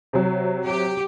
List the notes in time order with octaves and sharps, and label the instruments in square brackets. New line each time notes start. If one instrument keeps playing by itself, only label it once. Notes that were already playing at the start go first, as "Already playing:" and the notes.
[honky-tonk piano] C3 F#3
[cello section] G4